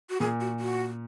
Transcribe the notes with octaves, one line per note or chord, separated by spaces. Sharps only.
F#4
A#2 G#4
F#4
F#4